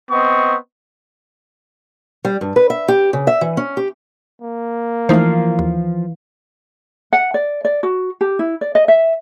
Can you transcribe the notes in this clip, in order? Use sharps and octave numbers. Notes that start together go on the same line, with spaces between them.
B3 C4 D#5 C#6
G3
G2
B4
E5
G4
C#3
E5
E3
C#4
G4
A#3
E3 F3 A3 D#4 C5 F5
D#2
F#5
D5
D5
F#4
G4
E4
D5
D#5
E5